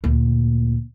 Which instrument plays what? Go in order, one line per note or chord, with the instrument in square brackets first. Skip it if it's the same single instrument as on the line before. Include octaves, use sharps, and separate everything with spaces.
[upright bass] D2 A#2